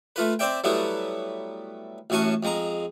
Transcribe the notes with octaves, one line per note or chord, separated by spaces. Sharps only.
A3 F4 B4
C4 C5 D5 E5 G5
F#3 G3 A3 B3 E4
A1 F#2 F#4 G#5 A5 C#6
F2 G#3 A#5